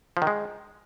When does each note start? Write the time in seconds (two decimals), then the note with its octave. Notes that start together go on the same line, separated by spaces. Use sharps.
0.17 F3
0.22 D#3
0.27 G#3